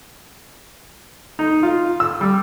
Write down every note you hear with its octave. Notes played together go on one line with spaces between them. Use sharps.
D#4
F4
E6
G3